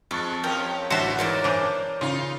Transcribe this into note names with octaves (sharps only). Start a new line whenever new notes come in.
F2 G#3 A4 C#6 A6
F3 C#4 G4 A#4 G5 F6
A1 E3 D4 F#4 C5 E5 A5 C#7
G#2 E3 A#4 C#5 D5 E6
E3 D4 C5 D6 G6
C#3 D#4 F4 C6